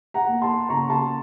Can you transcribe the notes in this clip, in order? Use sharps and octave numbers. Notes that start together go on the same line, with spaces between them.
F#5 A#5
A#3
A5 C6
C#3 A#5 C#6
A5 C6